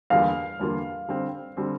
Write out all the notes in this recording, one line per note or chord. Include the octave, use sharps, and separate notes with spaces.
E2 D3 G3 A#3 F4 F5
E2 D3 G3 A#3 F4
D3 G3 C4
D3 G3 C4